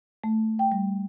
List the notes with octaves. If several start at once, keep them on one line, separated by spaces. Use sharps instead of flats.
A3
G5
G3